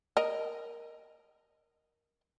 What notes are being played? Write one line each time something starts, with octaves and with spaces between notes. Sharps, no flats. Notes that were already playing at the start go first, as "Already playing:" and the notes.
A#4 D#5